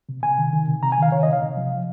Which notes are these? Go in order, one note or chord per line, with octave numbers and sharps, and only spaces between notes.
C3
C3 G#5
D#3
D#3
C3
C3 A#5
G#5
D#3 F5
D#3 C#5
D#5
C3 F5
C3
F3
F3